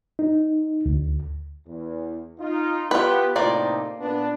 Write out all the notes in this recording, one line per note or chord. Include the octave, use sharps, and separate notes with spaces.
D#4
D2
E2
D#4 F4
B3 F4 G4 B4
A2 C3 A#3 D#4 F4 D5
A#2 B3 D4